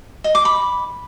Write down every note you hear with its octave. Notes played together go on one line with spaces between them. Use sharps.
D#5
D6
B5